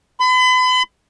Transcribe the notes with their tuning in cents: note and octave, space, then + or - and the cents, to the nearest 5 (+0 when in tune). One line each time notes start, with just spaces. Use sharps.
B5 +40